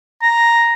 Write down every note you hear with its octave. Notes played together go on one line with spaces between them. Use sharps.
A#5